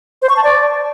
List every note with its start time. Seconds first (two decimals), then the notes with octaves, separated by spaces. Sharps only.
0.22 C5
0.29 C#6
0.36 A5
0.44 D5